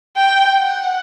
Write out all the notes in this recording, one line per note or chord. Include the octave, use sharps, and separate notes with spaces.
G5
F#5